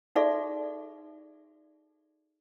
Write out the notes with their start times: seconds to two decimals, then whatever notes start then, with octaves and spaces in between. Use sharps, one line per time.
0.16 D#4 F#4 G#4 A4 D5 E5